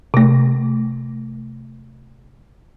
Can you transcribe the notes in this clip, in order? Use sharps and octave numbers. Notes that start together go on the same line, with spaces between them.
C3 A3